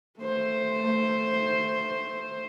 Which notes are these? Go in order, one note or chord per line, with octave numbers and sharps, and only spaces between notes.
A3 C5